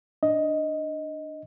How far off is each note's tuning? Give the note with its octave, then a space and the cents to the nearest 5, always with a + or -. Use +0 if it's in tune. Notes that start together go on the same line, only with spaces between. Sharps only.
D4 +15 D#5 +10